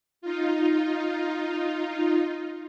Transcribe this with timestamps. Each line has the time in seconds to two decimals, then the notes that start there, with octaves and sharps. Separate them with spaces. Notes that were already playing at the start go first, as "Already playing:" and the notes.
0.22 D#4 F4